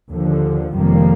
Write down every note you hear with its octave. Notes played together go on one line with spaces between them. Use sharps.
D#2 D3 F3
F1 F2 D#3 G3 A#3